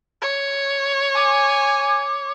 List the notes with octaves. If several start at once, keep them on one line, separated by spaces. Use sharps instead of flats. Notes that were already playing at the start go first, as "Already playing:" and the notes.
C#5
G#5 D6